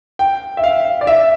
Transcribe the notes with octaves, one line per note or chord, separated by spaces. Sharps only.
G5
E5
F5
D5
E5